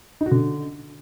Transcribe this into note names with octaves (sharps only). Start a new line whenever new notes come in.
D#4
F#4
D3